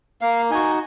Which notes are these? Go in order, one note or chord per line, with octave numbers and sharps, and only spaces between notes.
A#3 F5
D#4 F#4 G#5